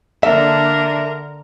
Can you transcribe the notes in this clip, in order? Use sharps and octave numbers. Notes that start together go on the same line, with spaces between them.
D3 A#3 D4 A#4 E5